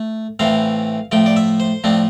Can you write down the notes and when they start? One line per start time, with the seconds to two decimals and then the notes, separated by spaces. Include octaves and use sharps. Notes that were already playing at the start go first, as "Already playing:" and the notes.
Already playing: A3
0.39 A2 E3 A3 C4 F5
1.12 A2 F3 A3 G5
1.26 D5
1.36 E5
1.60 C5
1.84 A2 F3 A3 C4 D4